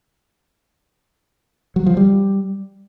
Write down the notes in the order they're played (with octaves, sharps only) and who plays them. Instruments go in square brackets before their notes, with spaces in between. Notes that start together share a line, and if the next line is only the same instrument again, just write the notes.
[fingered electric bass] F#3
F3
G3